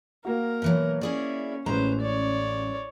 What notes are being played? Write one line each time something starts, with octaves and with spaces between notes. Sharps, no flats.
A#3 F#4 A#4
B2 E3 F#3
C#4 E4 G#4 D5
A1 G#3 C#4 B4 C5 A#5
C#5 D5